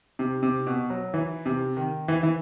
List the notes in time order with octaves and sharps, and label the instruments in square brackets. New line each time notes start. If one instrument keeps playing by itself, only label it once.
[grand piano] C3
C3
B2
F#3
E3
C3
D#3
E3
E3